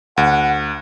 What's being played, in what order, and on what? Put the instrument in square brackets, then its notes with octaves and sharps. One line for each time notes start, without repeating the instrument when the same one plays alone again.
[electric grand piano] D2 [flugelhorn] F#5